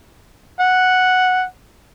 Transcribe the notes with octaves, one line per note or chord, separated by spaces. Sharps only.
F#5